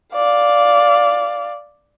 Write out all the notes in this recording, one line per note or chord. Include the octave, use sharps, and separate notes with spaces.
D5 F5